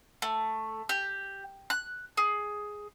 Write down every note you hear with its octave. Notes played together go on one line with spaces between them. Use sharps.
A3
G4
F#6
G#4